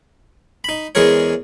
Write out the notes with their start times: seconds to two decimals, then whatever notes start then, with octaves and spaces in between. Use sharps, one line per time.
0.64 D#4 B5
0.95 E2 E3 G#3 G#4 A#4 C#5